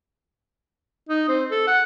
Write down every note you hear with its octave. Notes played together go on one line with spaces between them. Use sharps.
D#4
C4
A4
F#5